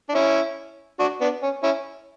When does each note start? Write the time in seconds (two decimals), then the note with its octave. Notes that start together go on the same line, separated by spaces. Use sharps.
0.09 D4
0.15 C#4 E4
0.99 D4 F#4
1.21 B3 D4
1.43 C#4
1.63 C#4 E4